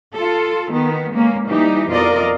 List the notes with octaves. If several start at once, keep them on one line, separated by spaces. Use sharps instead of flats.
F4 A4
D#3 B3
G#3 A#3 C#4
E3 G3 D#4 G4
F2 B2 F4 A#4 D5 D#5